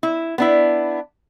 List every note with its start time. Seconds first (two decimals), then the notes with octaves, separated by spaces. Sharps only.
0.03 E4
0.38 B3 D4 E4